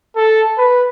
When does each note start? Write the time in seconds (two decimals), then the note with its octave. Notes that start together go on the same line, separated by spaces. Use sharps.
0.16 A4
0.57 B4